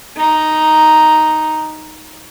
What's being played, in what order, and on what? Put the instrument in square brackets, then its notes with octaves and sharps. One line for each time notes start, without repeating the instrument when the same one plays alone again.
[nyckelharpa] D#4 A#5